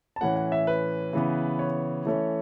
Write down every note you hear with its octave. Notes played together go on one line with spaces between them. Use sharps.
A5
A2 E3 C#4 F#5
F#5
E5
B4
C#3 E3 B3
C#5
E3 A3 C#4